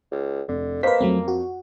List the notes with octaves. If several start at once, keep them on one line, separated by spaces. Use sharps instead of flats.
C#2
F1 D3
A#3 B4 C5 D#5 F5 B6
F2 F#3 A3 C4
F#4